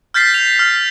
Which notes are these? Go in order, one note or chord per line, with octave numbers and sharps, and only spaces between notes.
F6 G6 A6 B6 C7
F7
F6